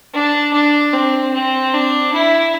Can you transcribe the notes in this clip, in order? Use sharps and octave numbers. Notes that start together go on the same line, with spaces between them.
D4
D4
C4
C4
D4
E4